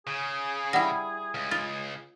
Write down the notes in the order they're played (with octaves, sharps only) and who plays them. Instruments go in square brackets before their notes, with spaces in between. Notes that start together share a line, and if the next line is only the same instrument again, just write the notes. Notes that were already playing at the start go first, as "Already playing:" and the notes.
[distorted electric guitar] C#3 [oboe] G#4
[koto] G3 E4 [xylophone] F#5 A#6
[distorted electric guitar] C#2
[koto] F4 [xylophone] A6